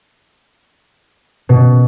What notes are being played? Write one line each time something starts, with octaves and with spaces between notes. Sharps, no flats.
B2